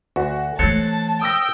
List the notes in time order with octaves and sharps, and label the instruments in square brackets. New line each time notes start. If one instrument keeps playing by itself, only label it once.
[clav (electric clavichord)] D2 [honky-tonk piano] F#4
[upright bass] E3 A3 [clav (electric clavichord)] C4 A4 C#5 [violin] A5 [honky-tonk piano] F#6
[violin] G5 [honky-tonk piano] D#6 E6 A#6